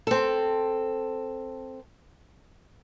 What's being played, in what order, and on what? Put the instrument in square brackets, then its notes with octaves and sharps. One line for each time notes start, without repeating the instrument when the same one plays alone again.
[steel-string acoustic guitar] C4 A4